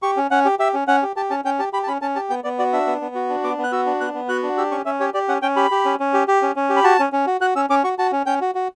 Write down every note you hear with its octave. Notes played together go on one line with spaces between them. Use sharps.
G4 C#6
C#4
C#4 F#5
G4
G4 E5
C#4
C#4 F#5
G4
G4 A5
C#4 A5
C#4 G5
G4 A5
G4 B5
A5
C#4 B5
C#4 A5
G4 A5
B3 G5
B3 D5
F#4 D5
D4 E5
B3
B3
F#4
D4
B3 D6
B3
F#6
F#4 E6
D4
B3 F#6
B3
F#4 F#6
D4
G4 E6
C#4 C#6
C#4 E5
G4 C#5
G4 D5
C#4 F#5
C#4 G5
G4 B5
G4
C#4
C#4
G4
G4
C#4
C#4
G4
B5
F#4 A5
C#4
C#4
F#4
F#4 F#6
C#4 E6
C#4 D6
F#4 C#6
F#4 A5
C#4
C#4 G5
F#4
F#4